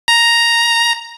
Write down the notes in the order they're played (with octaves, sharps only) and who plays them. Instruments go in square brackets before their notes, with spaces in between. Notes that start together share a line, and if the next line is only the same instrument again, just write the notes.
[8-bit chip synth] A#5